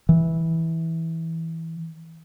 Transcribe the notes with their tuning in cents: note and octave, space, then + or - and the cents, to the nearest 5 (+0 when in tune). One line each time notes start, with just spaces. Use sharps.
E3 -15